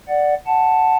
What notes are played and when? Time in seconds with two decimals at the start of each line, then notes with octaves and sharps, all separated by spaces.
0.08 D5 F#5
0.46 F#5 A5